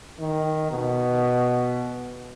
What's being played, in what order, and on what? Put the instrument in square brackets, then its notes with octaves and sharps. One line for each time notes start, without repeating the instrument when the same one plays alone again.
[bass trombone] D#3
B2